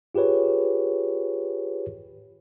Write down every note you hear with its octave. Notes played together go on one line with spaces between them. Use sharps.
F4 G4 G#4 B4 C#5